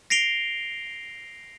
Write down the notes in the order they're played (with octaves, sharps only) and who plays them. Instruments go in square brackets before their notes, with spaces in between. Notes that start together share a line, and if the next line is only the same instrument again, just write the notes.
[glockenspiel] A#6 C7 D7 F7 G7